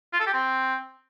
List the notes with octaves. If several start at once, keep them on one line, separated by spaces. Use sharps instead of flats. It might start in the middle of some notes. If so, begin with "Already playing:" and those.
F4
A4
G4
C4